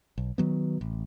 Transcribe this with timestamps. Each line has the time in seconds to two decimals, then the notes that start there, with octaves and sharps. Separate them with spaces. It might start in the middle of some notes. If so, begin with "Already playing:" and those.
0.18 B1
0.38 D#3 F#3 B3
0.81 A1